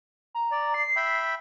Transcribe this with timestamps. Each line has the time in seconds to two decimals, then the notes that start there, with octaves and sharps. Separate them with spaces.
0.35 A#5
0.51 D5
0.74 C7
0.96 E5 G5 B5